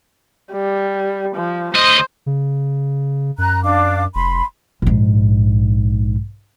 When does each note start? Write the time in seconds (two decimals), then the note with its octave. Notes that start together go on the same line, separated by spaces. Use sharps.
0.53 G3
1.36 F3
1.75 D2 C5 D#5
2.26 C#3
3.38 F#2 A#5 F#6
3.63 D4 F5 D6
4.15 F1 B5 C6
4.82 A#1 G#2